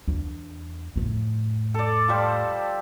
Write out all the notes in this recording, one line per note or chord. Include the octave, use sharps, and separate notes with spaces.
E2 D4
F2 A2
A4 D5
F3 G3 C5